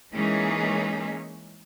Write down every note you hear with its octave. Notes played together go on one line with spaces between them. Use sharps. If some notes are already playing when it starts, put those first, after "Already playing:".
E3 G#3 A#3 C#4 D#4 G#4